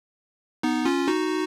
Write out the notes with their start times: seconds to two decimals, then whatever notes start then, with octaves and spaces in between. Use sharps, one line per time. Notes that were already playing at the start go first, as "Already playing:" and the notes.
0.63 B3 D#4
0.85 C#4 F4
1.08 D#4 F#4